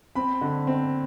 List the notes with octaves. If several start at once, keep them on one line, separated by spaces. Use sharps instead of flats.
C4 B5
D3
C4